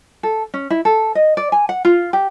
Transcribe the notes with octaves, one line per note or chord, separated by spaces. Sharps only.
A4
C#4
E4
A4
D#5
D5
G#5
F#5
F4
G4